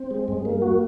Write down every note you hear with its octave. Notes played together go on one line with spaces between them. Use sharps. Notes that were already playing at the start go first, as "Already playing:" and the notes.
Already playing: C4
G#3
G2
A#3
F#4